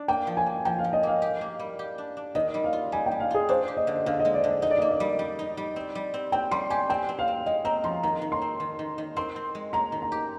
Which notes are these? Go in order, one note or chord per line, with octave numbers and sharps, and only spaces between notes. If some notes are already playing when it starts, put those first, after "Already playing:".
Already playing: D4
A#3 G5
F3
G#5
A#3
F3 G5
F5
F3
D#5
A#3 F5
G4
A#3
G3
G4
D4
D4
D#3 D#5
G3
F5
F4
G3 G#5
G5
G3
F5
F4 G#4
D4 C5
G4
D#5
D3
D3 F5
D#5
G#3
D5
D3
D#5
D#4 D#5
D5
D#5
A#3
D#5
G3
G3
D#4
G3
C4
G3
C4
C4 G5
G3 C6
G4 G#5
C4 G5
C4
F5
C4
G#3 D#5
C4 A#5
F3 C6
D#3 A#5
D#3
C6
C4
D#3
D#3
D#3
C4 C6
C4
G#3
G#3 A#5
D#3
A#5
G4